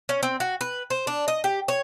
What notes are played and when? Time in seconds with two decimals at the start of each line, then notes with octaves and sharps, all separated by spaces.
0.09 C#4
0.23 C4
0.40 F#4
0.61 B4
0.90 C5
1.07 D4
1.28 D#5
1.44 G4
1.68 C#5